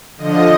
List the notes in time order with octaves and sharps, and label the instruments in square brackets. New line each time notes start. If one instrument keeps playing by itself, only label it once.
[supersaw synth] D3 F3 D#5